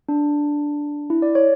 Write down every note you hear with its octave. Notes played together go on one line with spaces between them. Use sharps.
D4
E4
D5
C#5